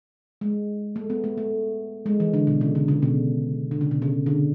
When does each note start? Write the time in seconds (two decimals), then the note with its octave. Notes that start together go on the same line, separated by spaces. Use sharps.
0.41 G#3
0.96 A3
1.10 B3
1.24 A3
1.38 A3
2.06 G#3
2.20 E3
2.34 D3
2.47 B2
2.61 C#3
2.75 D3
2.88 C#3
3.02 B2
3.71 D3
3.81 C#3
3.91 B2
4.02 C#3
4.26 D3